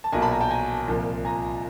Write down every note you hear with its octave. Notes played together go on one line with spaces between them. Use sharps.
A5
B1 A#2 F#3 G#5 A#5
A5 B5
G#5 A#5
G5 A5
G#5 A#5
C2 A#2 F3
G#5 A#5